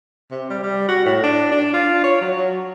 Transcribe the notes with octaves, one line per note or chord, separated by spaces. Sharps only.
C3
G3
G3
F#4
A2
D4
D4
F4
C#5
F#3
F#3